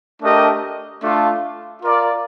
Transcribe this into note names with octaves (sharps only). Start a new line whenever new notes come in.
A3 D4 G4 A#4 D#5
A3 D4 F4
F4 A#4 D5 F5